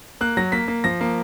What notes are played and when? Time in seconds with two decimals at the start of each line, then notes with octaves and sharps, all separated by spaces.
0.21 A#3 F#6
0.37 F#3 A#6
0.52 A#3 B6
0.68 A#3
0.84 F3 A#6
1.01 A#3